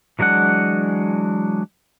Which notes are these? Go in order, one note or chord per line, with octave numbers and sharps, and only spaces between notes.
E3 F#3 G#3 D4 F#5